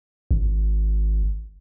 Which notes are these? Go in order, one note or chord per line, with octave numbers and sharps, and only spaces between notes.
G#1